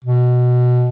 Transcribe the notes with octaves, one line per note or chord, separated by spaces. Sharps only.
B2